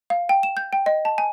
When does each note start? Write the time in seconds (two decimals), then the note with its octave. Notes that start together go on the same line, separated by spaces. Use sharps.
0.10 F5
0.29 G5
0.43 E7
0.57 G6
0.73 G5
0.86 D#5
1.05 A5
1.18 G#5